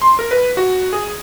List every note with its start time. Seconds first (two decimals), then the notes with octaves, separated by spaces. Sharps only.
0.02 C6
0.19 A#4
0.31 B4
0.57 F#4
0.93 G#4